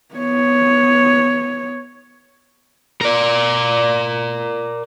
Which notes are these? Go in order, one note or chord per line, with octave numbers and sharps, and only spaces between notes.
B3 C#5
A#4 D5